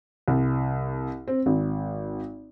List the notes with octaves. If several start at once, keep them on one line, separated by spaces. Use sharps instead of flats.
C2
C4
G#1